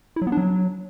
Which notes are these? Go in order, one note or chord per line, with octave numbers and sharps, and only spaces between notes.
E4
F#3
B3
D4
F#3